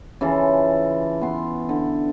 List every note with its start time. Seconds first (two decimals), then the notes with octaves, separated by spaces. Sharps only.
0.21 C#3 E3 F4 A4
1.21 B3 C6
1.69 D3